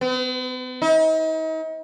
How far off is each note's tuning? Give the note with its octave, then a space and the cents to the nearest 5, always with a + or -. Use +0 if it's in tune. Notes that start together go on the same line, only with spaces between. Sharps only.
B3 +45
D#4 +40